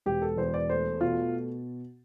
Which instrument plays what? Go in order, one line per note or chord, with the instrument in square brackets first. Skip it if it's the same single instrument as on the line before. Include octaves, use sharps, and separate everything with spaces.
[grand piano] E1 G4
A4
E2 C5
D5
A3 C5
B2 F4